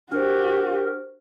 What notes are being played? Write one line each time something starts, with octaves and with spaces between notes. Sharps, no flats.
D4 F#4 G4 A#4 C5